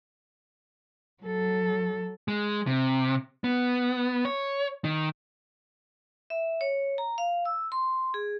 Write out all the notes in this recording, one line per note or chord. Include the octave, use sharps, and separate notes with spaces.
F#3 A4
G#3
C3
B3
C#5
D#3
E5
C#5
A#5
F5
E6
C6
G#4